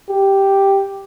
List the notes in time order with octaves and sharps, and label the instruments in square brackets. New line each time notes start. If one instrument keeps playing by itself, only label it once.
[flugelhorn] G4